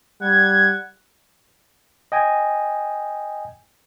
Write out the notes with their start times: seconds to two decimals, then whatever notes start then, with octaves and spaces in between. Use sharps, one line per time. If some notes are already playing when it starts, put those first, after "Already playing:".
0.21 G3 F#5 G#6
2.12 D#5 G5 G#5